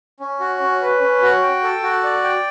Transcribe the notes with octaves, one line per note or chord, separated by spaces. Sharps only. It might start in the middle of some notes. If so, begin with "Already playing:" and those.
C#4
F#4
C#4
B4
C#4
F#4
G5
A4
F#4
D5
G5